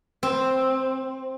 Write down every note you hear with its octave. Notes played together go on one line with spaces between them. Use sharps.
C4